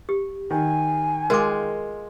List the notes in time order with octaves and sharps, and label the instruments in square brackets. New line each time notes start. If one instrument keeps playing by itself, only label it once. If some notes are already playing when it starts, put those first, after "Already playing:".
[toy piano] G4
[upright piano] D#3 [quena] G#5
[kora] G#3 F4 [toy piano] A#4 D6